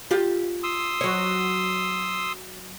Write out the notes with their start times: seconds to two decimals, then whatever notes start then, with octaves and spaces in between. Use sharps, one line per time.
0.11 F4 G4
0.63 C6 D#6 E6
1.01 F#3 C#5